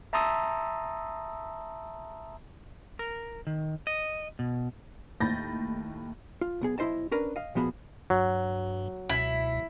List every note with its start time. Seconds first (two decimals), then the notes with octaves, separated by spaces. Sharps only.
0.13 E5 A5 A#5 C6 D#6 E6
2.99 A#4
3.47 D#3
3.87 D#5
4.39 B2
5.20 D#2 A2 B5 G6 A6 A#6
6.41 F4
6.61 B1 B3 G#4
6.78 B1 E4 C5 D#5 A5
7.11 C#4 D4 A#4 B4
7.36 D#5 F5
7.55 A#2 F3 B3 F#4 G#4 B5
8.10 G2 F#3
9.09 C#2 B2 E4